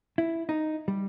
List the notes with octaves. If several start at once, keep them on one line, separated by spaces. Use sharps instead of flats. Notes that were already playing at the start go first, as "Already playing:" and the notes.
E4
D#4
G3